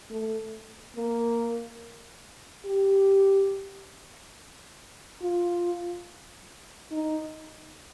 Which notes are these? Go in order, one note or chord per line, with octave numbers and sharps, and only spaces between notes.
A3
A#3
G4
F4
D#4